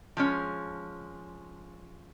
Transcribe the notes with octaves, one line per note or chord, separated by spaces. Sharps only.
F3 G#3 C#4